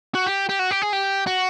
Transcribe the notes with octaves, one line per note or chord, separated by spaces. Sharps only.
F#4
G4
G4
F#4
G4
G#4
G4
F#4